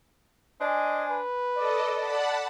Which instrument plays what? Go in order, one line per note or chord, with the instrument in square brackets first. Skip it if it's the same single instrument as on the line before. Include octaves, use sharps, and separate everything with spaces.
[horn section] D4 C5 G#5 [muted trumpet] D#5
[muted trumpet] B4
[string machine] A4 D#5 [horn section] D5
[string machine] F#5 A5 B5